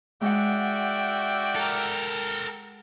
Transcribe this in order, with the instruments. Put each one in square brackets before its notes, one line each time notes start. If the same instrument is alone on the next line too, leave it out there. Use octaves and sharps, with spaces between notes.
[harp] G#3 F#5 [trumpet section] F#4 D5 E5 [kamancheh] G5
[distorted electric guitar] A4 A#4